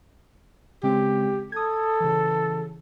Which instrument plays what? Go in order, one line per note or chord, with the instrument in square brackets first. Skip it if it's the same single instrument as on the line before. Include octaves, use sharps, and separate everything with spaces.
[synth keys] C#3 G#3 C4 [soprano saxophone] G4
[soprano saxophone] A4 [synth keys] D#6 G#6
[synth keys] C#3 E3